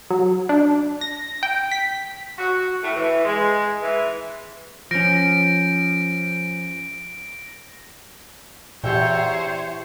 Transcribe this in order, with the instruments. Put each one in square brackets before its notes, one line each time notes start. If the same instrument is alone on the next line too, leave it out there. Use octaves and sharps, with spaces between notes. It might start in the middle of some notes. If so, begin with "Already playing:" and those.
[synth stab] F#3
D4
A#6
G5
B6
[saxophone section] F#4
A2
E3
G#3
E3
[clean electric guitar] F3 C#4 [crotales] A#6 D7
[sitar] E2 [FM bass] A#2 [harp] G4 E5 G5 [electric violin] C5 C#5